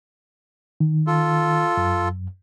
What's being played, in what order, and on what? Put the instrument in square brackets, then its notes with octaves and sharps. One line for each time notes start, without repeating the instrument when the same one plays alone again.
[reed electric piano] D#3
[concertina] F4 A4
[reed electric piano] F#2